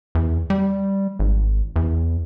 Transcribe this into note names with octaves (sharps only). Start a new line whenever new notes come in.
E2
G3
G#1
E2